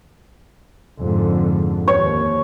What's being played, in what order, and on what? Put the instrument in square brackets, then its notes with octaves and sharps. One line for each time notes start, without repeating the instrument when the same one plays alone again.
[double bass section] F2 G#2 D3
[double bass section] D#2 [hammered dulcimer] C#5